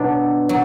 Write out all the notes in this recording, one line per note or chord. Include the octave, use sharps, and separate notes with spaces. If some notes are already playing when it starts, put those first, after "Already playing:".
Already playing: B2 F#3 B3 D4
F#3